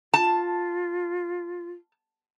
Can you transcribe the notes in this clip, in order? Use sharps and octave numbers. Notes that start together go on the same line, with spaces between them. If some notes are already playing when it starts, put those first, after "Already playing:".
F4 A5